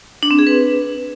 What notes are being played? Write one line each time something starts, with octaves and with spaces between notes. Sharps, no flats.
D4
C4
G#4
B4